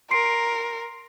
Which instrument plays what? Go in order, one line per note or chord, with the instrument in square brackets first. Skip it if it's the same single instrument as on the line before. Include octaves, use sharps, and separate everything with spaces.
[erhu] A#4 [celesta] C6 C7 D7